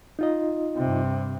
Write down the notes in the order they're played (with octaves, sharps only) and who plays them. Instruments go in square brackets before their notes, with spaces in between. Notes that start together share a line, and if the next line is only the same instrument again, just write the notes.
[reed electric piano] D#4 F4 D#5
[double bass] G2 C3